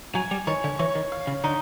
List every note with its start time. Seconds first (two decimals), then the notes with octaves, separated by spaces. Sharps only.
0.15 F#3 G#5
0.31 G3
0.47 D#3 C#5
0.64 D3
0.79 E3 C#5
0.95 D#3
1.12 F5
1.27 C#3
1.44 D3 D#4